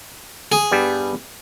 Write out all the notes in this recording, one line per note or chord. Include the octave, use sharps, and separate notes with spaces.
G#4
G2 G3 B3